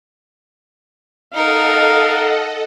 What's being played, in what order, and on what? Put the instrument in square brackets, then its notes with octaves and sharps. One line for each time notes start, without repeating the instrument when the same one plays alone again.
[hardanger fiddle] D#4 A#4 [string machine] A4 D#5 F#5 [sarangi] F5